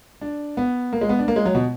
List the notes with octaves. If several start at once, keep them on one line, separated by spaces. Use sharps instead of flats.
D4
B3
A#3
G#3
B3
D4
A#3
G#3
F#3
B2